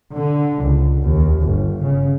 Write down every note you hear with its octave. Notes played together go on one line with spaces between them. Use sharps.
D3
C#2
D#2
G1
C#3